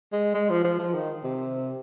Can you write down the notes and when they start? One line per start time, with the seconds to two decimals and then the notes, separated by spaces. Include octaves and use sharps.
0.12 G#3
0.34 G#3
0.50 F3
0.64 F3
0.79 F3
0.94 D#3
1.24 C3